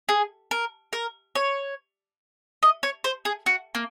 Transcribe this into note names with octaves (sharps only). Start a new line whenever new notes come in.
G#4
A#4
A#4
C#5
D#5
C#5
C5
G#4
F#4
A#3